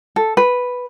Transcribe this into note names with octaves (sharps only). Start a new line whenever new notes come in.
A4
B4